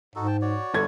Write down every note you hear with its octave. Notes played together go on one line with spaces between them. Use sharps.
G#2 D#4 F#4 A4
G5 A5
F#4 C#5 D5
G1 A4 G#6